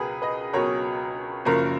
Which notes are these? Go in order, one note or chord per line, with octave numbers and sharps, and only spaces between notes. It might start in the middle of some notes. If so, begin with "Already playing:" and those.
Already playing: C#2 B2 F#3 G#4 A#4 B4
B4 D#5
C#2 B2 F#3 A#4 C#5
F#1 F#2 C#3 F3 A#4